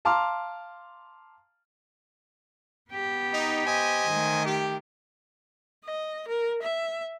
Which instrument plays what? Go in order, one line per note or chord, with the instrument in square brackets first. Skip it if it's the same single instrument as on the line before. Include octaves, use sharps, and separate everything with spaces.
[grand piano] F5 A5 A#5 C6 D6 F6
[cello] B3 G4
[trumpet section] D#4
C5 D#5 G#5
[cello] D#3 A3
[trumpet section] G4
[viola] D#5
A#4
E5